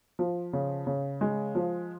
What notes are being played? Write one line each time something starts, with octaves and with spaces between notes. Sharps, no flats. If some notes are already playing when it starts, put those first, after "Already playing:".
F3
C#3
C#3
G#3
F3